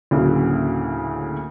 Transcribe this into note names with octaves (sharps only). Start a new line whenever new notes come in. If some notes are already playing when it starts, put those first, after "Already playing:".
D2 A2 C#3 F#3 A#3